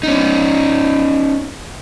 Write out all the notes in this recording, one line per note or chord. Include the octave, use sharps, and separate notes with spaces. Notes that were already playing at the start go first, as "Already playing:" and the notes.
C#4 D#4